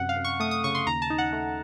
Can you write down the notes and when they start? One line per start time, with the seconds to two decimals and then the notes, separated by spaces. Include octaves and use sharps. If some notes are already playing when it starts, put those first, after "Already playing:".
Already playing: F#2 C3 F#5
0.09 F5
0.17 F#2
0.25 C#6
0.40 A3 D#6
0.51 D#6
0.64 C#3 C#6
0.75 C6
0.86 D#2 A#5
1.02 A5
1.10 D#4
1.18 F#5
1.33 A3